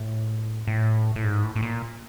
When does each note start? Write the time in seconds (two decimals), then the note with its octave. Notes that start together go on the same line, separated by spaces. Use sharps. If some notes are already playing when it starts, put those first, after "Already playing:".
Already playing: A2
0.67 A2
1.16 A2
1.24 G#2
1.43 A2
1.56 A2
1.62 A#2